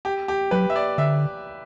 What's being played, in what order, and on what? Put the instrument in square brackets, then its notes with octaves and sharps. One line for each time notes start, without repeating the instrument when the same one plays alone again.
[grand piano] G4
G4
[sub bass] F#3 [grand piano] B4
[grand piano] E5
D5
[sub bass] D3 [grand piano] E5